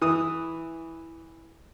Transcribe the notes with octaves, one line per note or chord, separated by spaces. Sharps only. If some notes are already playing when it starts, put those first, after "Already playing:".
E3 D#6